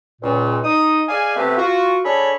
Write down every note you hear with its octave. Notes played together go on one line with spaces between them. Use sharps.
C#2 A#2
D#4 D#6
G#4 D5 D#5 F5 G#5
C3 A3 B3 C4 G4 B4
F4 F#4
D4 G#4 A4 C#5 B5